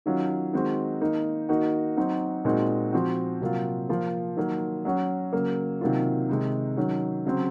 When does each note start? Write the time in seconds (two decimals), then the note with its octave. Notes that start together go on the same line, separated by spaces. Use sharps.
0.06 D#3 F#3 C#4 F4
0.53 D#3 G#3 C4 D#4 F#4
1.01 D#3 A#3 D#4
1.49 D#3 A#3 D#4 F#4
1.97 F#3 C4 D#4 F#4
2.45 A#2 G#3 C4 D#4 F#4
2.93 F3 C4 F#4
3.41 C3 F#3 A#3 F4
3.89 F3 A#3 F4
4.36 D#3 F#3 A#3
4.85 F#3 C#4 F#4
5.32 C#3 F#3 A#3
5.81 C3 D#3 F#3 A#3 F4
6.29 C3 D#3 G#3 D#4
6.76 D#3 F#3 C#4
7.25 C#3 F#3 C4